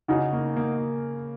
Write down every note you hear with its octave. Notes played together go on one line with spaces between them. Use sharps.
C#3 D#4 F#4
A#3
A#3